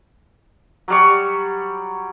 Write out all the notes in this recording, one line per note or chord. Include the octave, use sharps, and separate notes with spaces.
F#3 G3 C#6